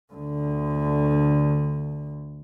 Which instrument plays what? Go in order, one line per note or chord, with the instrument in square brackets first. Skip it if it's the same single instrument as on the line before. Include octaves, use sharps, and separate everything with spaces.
[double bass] D2 D3